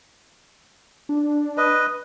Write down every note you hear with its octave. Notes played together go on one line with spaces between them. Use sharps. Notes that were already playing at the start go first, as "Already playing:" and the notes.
D4
B4 D#5